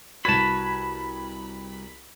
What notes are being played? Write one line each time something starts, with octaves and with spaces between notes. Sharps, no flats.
C2 F#4 B4 A5 B5 G#6